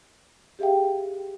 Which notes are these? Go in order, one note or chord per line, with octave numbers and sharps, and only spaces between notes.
G4 G#4 E5 F5 G5